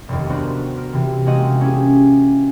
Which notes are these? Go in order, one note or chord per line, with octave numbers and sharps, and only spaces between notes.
F1 D#2
B3 D4 F#4 A#4 C5 F#5
A#4
C3 E3
G#3 A#3 C4 F#4 D#5 F#5
C#4 E4 G4 G#4